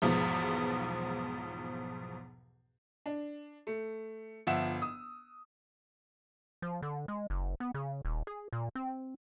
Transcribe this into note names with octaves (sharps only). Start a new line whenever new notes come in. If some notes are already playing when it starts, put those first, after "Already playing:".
B1 E2 G#2 B2 F3
D4
A3
G1 F3 E5 F#5 E6 E7
D#6
F3
D3
G#3
F#1
B3
C#3
D#1
G#4
A#2
C4